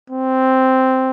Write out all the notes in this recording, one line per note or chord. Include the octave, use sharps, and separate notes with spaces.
C4